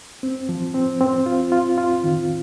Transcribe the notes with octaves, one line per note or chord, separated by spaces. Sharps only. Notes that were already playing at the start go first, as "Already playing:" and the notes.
C4
F3
C4
C4
F4
F4
F4
D#3